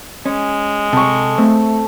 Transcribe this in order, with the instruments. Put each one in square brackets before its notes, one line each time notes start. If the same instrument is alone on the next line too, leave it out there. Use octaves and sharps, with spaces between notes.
[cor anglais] G#3 [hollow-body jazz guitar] C#4
[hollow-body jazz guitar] C3 [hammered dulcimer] A4 C#6
[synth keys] A3 [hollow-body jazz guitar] C4